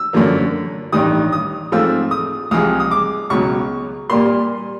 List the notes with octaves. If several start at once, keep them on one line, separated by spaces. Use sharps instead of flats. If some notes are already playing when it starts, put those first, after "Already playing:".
Already playing: E6
F#2 D3 F3 A#3
A1 G2 D#3 D#6
D#6
G#2 F3 A3 C4 F4 E6
D#6
C2 C3 F3 G#3 D#6
D#6
D6
C#2 B2 F#3 C#6
A#2 G3 A#3 C6